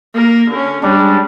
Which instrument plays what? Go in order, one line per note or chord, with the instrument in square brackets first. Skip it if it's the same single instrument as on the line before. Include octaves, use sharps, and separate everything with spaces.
[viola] A#3 A#4
D3 C#4
[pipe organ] G3 D4 [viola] G#3 C#4